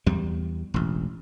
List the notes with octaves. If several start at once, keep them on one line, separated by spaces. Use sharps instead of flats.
E2 G3
E1 A1